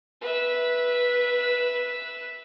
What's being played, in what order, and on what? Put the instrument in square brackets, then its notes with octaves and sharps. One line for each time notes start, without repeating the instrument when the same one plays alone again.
[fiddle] B4 E5